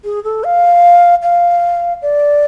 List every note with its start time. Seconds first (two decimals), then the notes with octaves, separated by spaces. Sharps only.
0.04 G#4
0.24 A4
0.44 F5
1.22 F5
2.02 D5